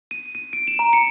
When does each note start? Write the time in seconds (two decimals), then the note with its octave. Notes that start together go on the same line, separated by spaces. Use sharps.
0.11 D#7
0.35 D#7
0.53 D7
0.67 E7
0.79 A#5
0.93 C#7